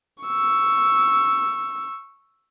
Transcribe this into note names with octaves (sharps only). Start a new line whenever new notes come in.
C#6 E6